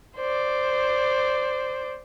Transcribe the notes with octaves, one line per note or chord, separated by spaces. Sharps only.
C5 D5